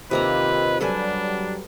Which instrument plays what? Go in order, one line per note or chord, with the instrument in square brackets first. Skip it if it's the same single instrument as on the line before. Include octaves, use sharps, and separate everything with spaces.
[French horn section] D#2 F4 D#5 [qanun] C3 A#3 A#5 [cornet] B4
[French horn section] F#3 G3 [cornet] D4 [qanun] A4 B4 G#5